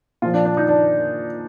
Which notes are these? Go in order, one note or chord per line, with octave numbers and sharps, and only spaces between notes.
A#2 F3 F4
D4
D4
D#4
D4